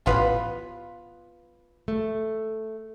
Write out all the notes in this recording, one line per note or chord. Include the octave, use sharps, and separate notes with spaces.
A1 B3 F4 B4
A3